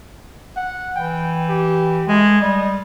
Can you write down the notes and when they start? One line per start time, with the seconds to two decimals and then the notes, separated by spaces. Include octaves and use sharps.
0.56 F#5
0.96 E3 G5
1.49 G4
2.08 G#3 A3
2.41 G3 D#5